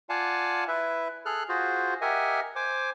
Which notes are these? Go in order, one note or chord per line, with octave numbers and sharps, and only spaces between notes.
F4 D5 F5 F#5 G#5 A5
E4 B4 E5
G#4 A4 F6 F#6
F4 F#4 G#4 C5
G4 A#4 D#5 E5 F#5 G#5
C5 G#5 D6